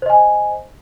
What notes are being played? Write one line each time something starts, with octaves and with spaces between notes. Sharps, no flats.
C5 D#5 G#5